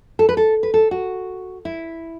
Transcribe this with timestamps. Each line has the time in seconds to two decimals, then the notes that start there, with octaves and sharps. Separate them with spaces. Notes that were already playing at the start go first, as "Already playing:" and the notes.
0.19 A4
0.29 B4
0.37 A4
0.63 B4
0.74 A4
0.91 F#4
1.65 E4